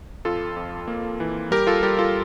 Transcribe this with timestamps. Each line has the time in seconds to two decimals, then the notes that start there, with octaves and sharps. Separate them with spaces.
0.25 F2 F4 A4
0.56 F2
0.88 A#3
1.20 E3
1.51 G3 G4 A#4
1.67 F4 A4
1.82 G3 G4 A#4
1.99 F4 A4